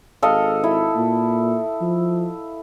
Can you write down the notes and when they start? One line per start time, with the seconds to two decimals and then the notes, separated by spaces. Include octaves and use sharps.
0.22 G#1 A4 D#5 F5
0.64 E4
0.95 A#2
1.81 F3